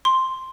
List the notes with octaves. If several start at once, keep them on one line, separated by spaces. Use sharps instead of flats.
C6